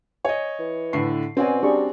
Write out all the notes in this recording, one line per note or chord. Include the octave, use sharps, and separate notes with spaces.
C#5 D#5 G#5
E3
A2 D3 C#6 C7
B2 C4 C#4 F#4 D5 G#5
G3 D4 G#4 C#6